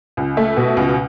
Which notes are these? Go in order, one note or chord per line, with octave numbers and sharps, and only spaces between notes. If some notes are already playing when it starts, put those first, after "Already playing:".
C#2
A3
B2
C#2